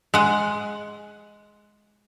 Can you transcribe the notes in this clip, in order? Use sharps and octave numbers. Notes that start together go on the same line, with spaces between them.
G#3 F#5